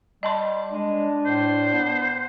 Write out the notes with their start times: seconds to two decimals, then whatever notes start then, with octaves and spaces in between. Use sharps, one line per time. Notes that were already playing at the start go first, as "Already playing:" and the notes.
0.23 G3 D#5 A5 C6
0.72 G#3 D4
1.26 A2 C5
1.73 B3